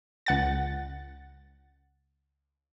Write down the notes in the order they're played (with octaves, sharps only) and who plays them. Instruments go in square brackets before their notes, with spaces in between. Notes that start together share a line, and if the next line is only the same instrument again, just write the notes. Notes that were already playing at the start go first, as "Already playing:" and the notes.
[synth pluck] C#2 F#5 A6